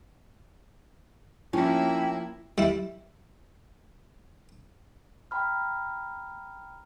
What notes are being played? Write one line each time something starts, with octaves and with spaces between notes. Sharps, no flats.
F3 A#3 C#4 E4 G5
G3 E4
G5 A#5 B5 F6